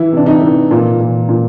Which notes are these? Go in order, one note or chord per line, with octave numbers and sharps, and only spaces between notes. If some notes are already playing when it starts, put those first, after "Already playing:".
Already playing: E3 E4
C3 D4
D#4
E3
A#2
A#2
A#2